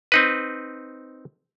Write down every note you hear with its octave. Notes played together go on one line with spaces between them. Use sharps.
C4 D#4 B4